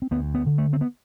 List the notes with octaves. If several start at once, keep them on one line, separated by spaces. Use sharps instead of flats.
C4
D2 B3
B3
D3
A3
C4
B3